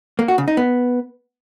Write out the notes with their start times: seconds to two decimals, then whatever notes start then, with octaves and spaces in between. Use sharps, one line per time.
0.19 A#3
0.28 F#4
0.38 C#3
0.48 D#4
0.57 B3